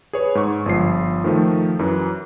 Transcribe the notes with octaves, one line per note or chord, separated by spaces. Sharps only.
G#4 B4 C#5
G#2 C#6
G1 F3 C7
D#3 F3 A3
F#2 E3